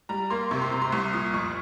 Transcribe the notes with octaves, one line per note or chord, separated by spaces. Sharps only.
G3 A#5
A#3 C6
C3 C#6
C6
C3 A#5
C6
C2 C#6
A#2 D#6
F2 C#6